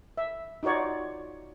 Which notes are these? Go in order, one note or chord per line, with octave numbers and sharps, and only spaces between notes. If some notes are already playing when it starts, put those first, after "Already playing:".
E5
D#4 F4 F#4 C#5 D5